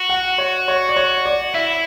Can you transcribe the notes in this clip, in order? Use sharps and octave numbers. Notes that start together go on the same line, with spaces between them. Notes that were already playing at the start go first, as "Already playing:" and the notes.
Already playing: F#4
F#5
C#5
C#5
D5
C#5
D5
E4 E5